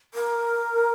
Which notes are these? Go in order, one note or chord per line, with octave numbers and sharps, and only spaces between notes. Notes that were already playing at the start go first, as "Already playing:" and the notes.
A#4